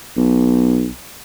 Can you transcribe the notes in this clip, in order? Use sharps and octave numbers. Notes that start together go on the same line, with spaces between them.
B1